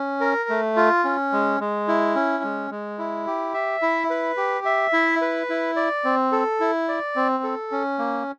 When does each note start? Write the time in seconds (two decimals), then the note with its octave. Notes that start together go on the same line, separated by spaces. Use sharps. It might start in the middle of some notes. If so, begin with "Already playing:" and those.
Already playing: C#4
0.21 A#4
0.49 A3
0.76 F4
1.04 C#4
1.33 G#3
1.60 G#3
1.88 E4
2.15 C#4
2.44 G#3
2.71 G#3
2.98 E4
3.27 G4
3.54 E5
3.82 E4
4.10 B4
4.37 G4
4.65 E5
4.93 E4
5.22 B4
5.50 E4
5.76 D5
6.05 C4
6.32 A4
6.60 E4
6.88 D5
7.16 C4
7.44 A4
7.71 C#4
7.99 A#3